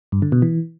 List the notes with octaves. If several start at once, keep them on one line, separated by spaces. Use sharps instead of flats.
G2
D3
B2
E3